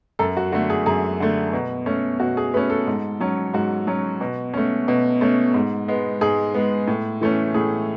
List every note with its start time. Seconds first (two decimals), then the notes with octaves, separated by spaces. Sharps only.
0.19 F#2 A4
0.37 F#4
0.53 D3 A3 F#4
0.70 G#4
0.86 F#2 G#4
1.20 D3 A3
1.53 B2
1.86 A3 C#4
2.20 B2 F#4
2.37 G#4
2.54 A3 C#4 B4
2.70 A4
2.87 G#2
3.21 F#3 C#4
3.53 G#2 F#4
3.87 F#3 C#4
4.21 B2
4.54 A3 C#4
4.88 B2
5.21 A3 C#4
5.54 G#2
5.88 G#3 B3
6.21 G#2 G#4
6.54 G#3 B3
6.88 A2
7.21 E3 A3 C#4
7.54 A2 G#4